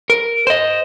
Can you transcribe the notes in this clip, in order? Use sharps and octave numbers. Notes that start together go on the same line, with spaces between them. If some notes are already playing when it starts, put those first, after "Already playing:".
A#4
C5 D#5